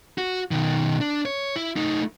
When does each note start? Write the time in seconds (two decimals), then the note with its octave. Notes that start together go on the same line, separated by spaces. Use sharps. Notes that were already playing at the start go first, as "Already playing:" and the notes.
0.18 F#4
0.51 B2 D#3
1.01 D4
1.25 C#5
1.56 E4
1.76 A3 D#4